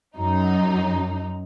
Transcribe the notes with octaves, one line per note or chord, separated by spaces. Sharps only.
F#2 D#4